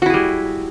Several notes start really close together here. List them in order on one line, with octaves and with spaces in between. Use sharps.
F#4 E4 G#4 G3